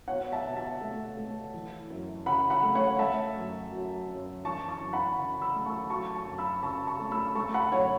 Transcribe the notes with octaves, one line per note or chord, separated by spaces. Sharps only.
B2 C#5 F#5
E5 A5
B2
E5 A5
A3
A3
E3
F#2
C#3 F#5 B5
F#5 B5
A3
C#5 F#5
A3 E5 A5
F#2
F#3
F#2
E3 A5 C#6
A5 C#6
F#2
F#5 B5
C#3
B5 E6
A3
A5 C#6
F#3 A5 C#6
A5 C#6
F#2
B5 E6
C#3 A5 C#6
A5 C#6
A3
B5 E6
A3 A5 C#6
F#5 B5
F#2 C#5 F#5